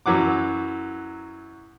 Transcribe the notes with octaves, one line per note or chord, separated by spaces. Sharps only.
F#2 E3 F#3 F#5 D6